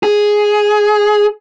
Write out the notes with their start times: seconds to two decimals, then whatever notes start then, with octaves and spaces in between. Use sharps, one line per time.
0.03 G#4